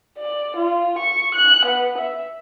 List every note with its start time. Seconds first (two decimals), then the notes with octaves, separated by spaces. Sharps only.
0.18 D5
0.56 F4
0.98 C#6
1.34 F#6
1.65 B3
1.98 E5